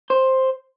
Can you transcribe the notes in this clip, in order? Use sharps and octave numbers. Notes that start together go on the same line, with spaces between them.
C5